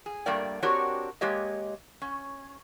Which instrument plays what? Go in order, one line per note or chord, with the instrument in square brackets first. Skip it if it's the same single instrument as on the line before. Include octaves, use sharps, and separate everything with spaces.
[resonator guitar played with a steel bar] G#4
G2 A3 A#3 A#4 D5 G5
C4 D4 F#4 G4 A#4 C#5
G#3 A#3 G4 C#5 D#5
C#4